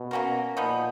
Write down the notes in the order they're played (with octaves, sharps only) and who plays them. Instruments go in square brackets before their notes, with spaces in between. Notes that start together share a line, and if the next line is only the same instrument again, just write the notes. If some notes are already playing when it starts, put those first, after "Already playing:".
Already playing: [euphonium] B2
[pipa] A#3 C#4 F#4 A#4
[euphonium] A#2 [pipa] F3 B3 D#4